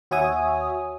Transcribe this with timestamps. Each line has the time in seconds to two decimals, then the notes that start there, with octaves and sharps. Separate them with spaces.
0.11 D#2 F#4 C#5 E5 G#5 D#6